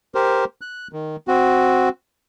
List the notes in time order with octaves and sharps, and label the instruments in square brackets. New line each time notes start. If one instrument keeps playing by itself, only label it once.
[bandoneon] G4 A#4 C5
F#6
D#3
C4 F#4